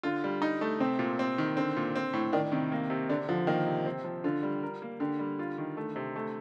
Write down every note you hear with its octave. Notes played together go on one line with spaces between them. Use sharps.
D3 F4
G3
D#4
A3
C3 C4
A#2
C4
D#3
D3 C4
A#2
C4
A2
D#3 D4
C3 D#3
A#3
C3
D3 D4
D3 F3
D#3 A#3
C3
C4
F3
D3 F4
G3
A#4
A#3
D3 G4
G3
F4
D#3
A3
C3
A3